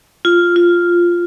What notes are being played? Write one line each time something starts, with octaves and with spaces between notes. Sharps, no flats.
F4
F4